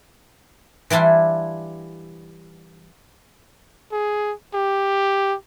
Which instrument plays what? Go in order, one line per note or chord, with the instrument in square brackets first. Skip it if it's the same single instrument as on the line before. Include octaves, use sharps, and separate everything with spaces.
[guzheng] E3 G3 D4 E4 F4
[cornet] G#4
G4